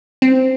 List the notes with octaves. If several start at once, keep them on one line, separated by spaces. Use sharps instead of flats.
C4